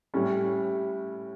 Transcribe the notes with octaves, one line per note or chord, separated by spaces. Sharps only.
A2 G3 C#4